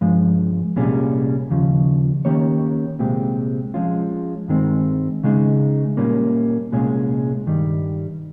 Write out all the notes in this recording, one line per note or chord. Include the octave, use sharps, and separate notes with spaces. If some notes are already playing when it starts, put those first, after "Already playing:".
G2 F3 G#3
C2 A#2 G3 C#4 G#4
D#2 C#3 F3
D#3 A#3 C#4 G4 C#5
C2 A#2 G#3 C4 G4
F3 G#3 C#4 F4
G2 D#3 G#3 C4
C#3 G#3 D#4 G#4
A#2 G3 A#3 C#4
C2 A#2 G#3 C#4 G#4
G2 D#3 G3